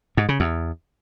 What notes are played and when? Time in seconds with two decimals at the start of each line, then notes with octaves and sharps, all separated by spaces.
0.17 G#2
0.29 C#3
0.40 E2